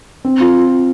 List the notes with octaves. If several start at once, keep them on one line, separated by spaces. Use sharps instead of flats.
C4
F4